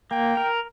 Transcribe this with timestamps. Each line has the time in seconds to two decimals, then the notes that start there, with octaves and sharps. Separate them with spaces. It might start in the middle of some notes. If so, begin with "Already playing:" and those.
0.11 A#3 G5
0.37 A#4